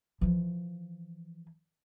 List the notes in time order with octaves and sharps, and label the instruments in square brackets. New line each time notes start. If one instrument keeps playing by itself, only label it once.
[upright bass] E3 F3